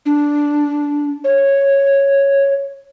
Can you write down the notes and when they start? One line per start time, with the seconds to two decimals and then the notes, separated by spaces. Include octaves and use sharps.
0.06 D4
1.24 C#5